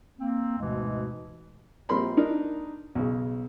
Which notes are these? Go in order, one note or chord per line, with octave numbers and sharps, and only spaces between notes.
A#3 C4
D2 G#2 B2 E3 G#3
A#1 G3 C4 A#4 B5 C6
D4 D#4 A#4
B1 C#3